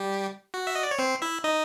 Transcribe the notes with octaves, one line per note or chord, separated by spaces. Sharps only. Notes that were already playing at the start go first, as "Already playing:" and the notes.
Already playing: G3 G4
F#4
E5
D#5
D5
C#5
C4 C5
E4 E5
D#4 D#5